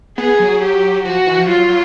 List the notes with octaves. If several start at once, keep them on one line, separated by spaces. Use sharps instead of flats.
B3 G#4
F#3
G4
F3 F#4
E3
F3
F#3 F4
F#3